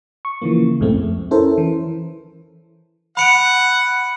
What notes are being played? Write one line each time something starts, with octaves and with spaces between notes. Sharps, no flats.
C#6
C#3 E3 F3 A#3
C2 F#2 A2 G#3 A3 C4
F2
C#4 E4 A4 A#4 C5
E3
F#5 B5 C#7 D7